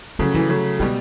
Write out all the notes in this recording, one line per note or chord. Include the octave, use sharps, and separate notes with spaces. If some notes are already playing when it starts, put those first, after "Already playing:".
C#3 F3 F#3 A3
E3
C#3 F#3 A3
B2 G3 G#3